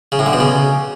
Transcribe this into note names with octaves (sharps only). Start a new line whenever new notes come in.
C#3
A2
D3
B2
C#3